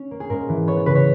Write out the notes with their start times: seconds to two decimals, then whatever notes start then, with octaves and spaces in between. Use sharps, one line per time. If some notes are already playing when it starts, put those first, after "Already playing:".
Already playing: C#4
0.11 A#3
0.20 G#4
0.29 G#2 A#4
0.49 E3
0.67 B3 C#5
0.86 C#3 B4
0.95 C#5